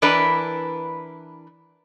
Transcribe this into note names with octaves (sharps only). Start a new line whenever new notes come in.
E3 D4 E4 A#4 B4